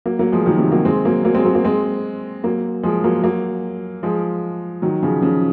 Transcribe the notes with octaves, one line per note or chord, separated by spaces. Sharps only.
F#3 A#3
F#3 A#3
F3 G#3
D#3 F#3
C3 D#3
F#3 A#3
G#3 C4
F#3 A#3
F#3 A#3
G#3 C4
F#3 A#3
F#3 A#3
G#3 C4
F#3 A#3
F3 G#3
F#3 A#3
F#3 A#3
F3 G#3
D#3 F#3
C#3 F3
C#3 F3